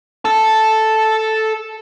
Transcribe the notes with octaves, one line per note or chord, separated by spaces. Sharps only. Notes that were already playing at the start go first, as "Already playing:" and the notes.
A4 A5